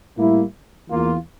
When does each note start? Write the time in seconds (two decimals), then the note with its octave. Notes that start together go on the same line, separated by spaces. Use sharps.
0.16 A2 G3 A#3 E4
0.90 E2 E3 A#3 F4